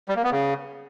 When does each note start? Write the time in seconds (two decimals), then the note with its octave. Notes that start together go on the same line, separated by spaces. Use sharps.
0.08 G3
0.16 A#3
0.24 B3
0.32 C#3